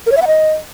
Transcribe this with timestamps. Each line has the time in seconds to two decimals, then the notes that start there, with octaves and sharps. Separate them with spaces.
0.06 A#4
0.12 C#5
0.17 E5
0.22 F#5
0.27 D#5